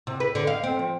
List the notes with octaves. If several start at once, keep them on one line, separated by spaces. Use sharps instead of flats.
C3
B4
D3
F5
C4
F3